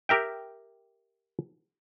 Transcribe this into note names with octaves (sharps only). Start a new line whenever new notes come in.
G4 A#4 E5 G5